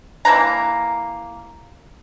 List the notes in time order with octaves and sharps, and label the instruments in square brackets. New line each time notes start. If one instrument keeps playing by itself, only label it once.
[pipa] E3 A#3 B4 A#5